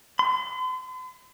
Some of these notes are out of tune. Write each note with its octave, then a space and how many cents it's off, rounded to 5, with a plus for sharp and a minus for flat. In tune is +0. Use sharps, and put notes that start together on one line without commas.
C6 -45